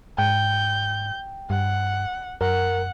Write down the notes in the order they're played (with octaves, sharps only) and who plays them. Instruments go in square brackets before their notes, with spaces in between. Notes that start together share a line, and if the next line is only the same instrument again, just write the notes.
[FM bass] G#2 [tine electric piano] G5 [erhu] G6
[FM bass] G2 [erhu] F#5
[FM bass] F#2 [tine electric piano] A#4 [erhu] F#5